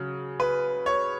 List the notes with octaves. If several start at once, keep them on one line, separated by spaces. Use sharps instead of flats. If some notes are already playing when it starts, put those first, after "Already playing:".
Already playing: C#3 F#3
B4
C#5